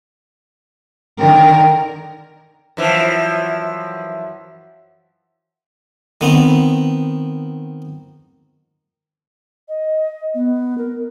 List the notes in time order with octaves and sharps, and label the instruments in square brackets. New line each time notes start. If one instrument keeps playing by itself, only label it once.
[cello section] D3 D#3 A#4 [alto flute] G5
[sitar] F#2 E3 F3
[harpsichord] D#3 B3 C4
[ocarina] D#5
B3
A#4